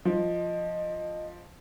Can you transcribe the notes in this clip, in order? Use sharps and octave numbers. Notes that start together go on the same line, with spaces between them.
F3 D#5